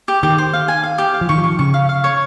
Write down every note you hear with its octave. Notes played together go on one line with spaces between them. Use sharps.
G4
D#3 G4
C5
F5
G#5
F5
G4
F5
F3
D#3 C#6
F3
C#6
C#3 C#6
F5
F5
C#5